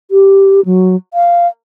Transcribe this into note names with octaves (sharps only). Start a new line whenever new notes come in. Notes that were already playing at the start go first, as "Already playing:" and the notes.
G4
F#3
F5